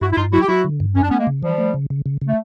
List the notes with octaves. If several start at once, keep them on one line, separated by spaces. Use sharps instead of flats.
G2 E4 F#4
E4
G2 D#4 F4
F#3 E4 F#4
G4
F#3 E4 F#4
D3
G2
F#2 C#4
D4
A3 B3 C#4
G#3 A#3
C#3
E3 F3 G3
A3
C#3
C#3
C#3
C#3
A3